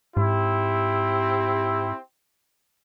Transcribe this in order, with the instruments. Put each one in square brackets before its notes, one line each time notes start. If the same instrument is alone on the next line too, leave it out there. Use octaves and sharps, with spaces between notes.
[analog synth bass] G#2 [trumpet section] C4 E4 [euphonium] G4